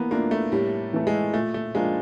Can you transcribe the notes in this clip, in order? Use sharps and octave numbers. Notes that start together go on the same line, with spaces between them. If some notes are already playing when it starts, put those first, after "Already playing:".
Already playing: E3 A#3 B3
A3 A#3 D4 F4
A3
A2 G3
E3 A3
G#3
A#2 A3
A3
F3 G#3 A#3 D4 F4